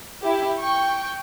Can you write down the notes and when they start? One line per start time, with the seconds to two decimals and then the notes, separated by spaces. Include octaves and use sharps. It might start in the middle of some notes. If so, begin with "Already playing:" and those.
0.23 E4 G4
0.58 G5 C#6